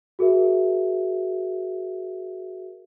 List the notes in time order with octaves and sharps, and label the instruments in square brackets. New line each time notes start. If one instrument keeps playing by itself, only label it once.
[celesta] F#4 G#4 A#4 E5